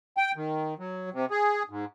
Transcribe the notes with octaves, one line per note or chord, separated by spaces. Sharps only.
G5
D#3
F#3
C3
G#4
G#2